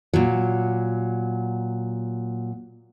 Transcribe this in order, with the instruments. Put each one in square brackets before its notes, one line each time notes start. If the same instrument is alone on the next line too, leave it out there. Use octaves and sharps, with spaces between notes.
[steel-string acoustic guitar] A#2 F#3